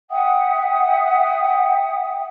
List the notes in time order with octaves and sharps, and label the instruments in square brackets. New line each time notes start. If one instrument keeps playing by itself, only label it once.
[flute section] E5 F#5 G5 D#6